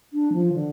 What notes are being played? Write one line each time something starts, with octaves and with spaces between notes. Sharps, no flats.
D4
F3
D3